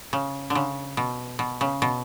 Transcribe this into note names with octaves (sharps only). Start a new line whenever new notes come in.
C#3
D3
C#3
B2
B2
C#3
B2